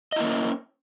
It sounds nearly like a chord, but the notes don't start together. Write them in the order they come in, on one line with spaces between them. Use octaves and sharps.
D#5 E4 A#3 C#4